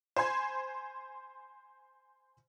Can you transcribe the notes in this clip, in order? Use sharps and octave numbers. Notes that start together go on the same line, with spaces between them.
C5 G#5 B5 C6 G#6